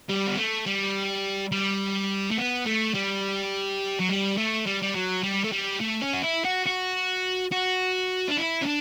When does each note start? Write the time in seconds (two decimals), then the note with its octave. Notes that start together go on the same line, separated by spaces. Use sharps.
0.09 G3
0.27 B3
0.37 A3
0.66 G3
1.52 G3
2.31 A3
2.37 B3
2.66 A3
2.95 G3
3.99 F#3
4.09 G3
4.37 A3
4.67 G3
4.82 G3
4.95 F#3
5.23 G3
5.44 A3
5.52 G3
5.80 A3
6.02 C#4
6.13 F#4
6.23 E4
6.44 F#4
6.66 F#4
7.52 F#4
8.28 D4
8.37 E4
8.62 C#4
8.66 D4